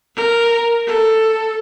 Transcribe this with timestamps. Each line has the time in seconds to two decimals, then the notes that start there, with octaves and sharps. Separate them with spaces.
0.15 A#4
0.86 A4